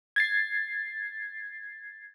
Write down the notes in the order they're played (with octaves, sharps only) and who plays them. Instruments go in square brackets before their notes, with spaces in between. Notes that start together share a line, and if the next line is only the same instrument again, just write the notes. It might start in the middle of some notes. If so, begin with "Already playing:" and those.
[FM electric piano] G#6 A6 C7